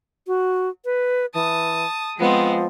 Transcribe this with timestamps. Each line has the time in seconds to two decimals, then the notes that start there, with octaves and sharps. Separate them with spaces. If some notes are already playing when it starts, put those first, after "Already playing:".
0.27 F#4
0.85 B4
1.34 E3 A5 D#6
2.18 F3 G#3 B3 C4